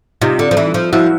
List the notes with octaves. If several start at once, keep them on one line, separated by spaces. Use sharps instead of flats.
C3 D#4 F4
D3
F3
E3
F3
F3 E4 F#4